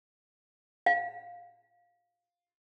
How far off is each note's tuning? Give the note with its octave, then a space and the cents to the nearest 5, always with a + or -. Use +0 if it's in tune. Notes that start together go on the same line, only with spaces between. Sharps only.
F5 +10